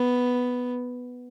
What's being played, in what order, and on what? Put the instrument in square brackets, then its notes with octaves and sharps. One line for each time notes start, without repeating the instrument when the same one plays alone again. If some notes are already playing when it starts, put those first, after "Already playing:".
Already playing: [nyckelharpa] B3